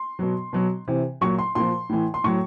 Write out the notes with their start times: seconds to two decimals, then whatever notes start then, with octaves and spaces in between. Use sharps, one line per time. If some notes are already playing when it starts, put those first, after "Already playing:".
Already playing: C6
0.19 B2 F#3
0.53 B2 F#3
0.88 C3 E3
1.21 A#2 F#3 C#6
1.38 C6
1.55 A#2 F3 C6
1.89 A2 E3
2.14 C6
2.24 A2 F#3 C#6